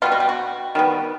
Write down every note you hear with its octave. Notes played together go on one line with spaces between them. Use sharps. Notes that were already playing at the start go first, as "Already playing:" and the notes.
B2 G3 B3 F4
F#4
G4
F#4
D#3 G3 B3